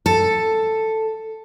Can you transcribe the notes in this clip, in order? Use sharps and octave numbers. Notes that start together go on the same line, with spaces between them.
A4